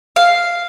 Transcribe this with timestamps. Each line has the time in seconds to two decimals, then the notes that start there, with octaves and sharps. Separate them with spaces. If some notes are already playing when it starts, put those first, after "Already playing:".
0.16 F5